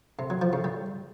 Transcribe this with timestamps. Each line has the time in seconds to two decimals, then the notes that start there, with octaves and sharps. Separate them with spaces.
0.19 C3
0.30 F#3
0.42 F3
0.53 C#3
0.64 G3